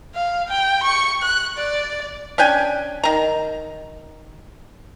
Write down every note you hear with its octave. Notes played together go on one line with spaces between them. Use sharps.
F5
G5
C#6
F#6
D5
C#4 D4 G5 G#5
D#3 A#5